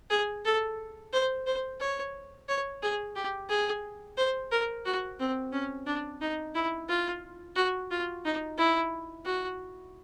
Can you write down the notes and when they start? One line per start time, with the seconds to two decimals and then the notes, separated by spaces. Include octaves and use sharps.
0.10 G#4
0.45 A4
1.13 C5
1.46 C5
1.80 C#5
2.49 C#5
2.82 G#4
3.16 G4
3.49 G#4
4.17 C5
4.52 A#4
4.85 F#4
5.20 C4
5.52 C#4
5.86 D4
6.21 D#4
6.55 E4
6.89 F4
7.56 F#4
7.91 F4
8.25 D#4
8.58 E4
9.25 F#4